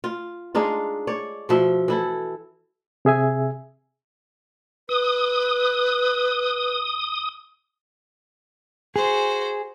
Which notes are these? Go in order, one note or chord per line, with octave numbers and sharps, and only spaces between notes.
F4
G#3 D4 D#4 F4
C#5 D5
B2 F3 E5
E3 E4 A4
C3 G#4 E5 G#5
B4 D#6
F#4 G#4 C5